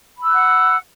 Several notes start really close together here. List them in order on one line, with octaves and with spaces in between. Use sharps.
B5 E6 F#6 F#5